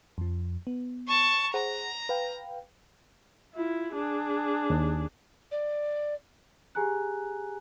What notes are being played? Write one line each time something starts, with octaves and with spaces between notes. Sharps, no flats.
F2 F3
B3
A5 C#6
G#4 C5 F#5 A#5
B4 F5 G5
E4 F4
D4 G#4
D#2
D5
G4 G#4 G#5 A#5 F#6